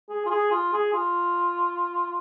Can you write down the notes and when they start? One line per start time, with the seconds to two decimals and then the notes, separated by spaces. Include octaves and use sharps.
0.09 G#4
0.26 F4
0.31 G#4
0.51 F4
0.73 G#4
0.93 F4